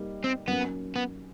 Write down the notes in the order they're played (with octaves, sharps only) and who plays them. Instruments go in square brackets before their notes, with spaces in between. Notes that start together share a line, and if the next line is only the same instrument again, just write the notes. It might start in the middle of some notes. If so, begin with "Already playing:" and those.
Already playing: [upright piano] G3 A#3 D#4
[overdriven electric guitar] C4
[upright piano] F#3 A#3 C#4 [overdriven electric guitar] B3
[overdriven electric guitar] B3